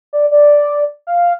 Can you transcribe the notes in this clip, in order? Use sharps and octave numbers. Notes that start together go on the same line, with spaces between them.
D5
D5
F5